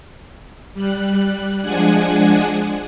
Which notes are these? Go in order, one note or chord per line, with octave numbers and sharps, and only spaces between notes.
G3 F#6
F3 G#3 D4 F#5 G#5